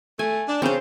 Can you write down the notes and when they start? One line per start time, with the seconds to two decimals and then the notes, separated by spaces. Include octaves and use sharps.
0.19 A3 G#5
0.47 D4
0.62 C#3 C4 C5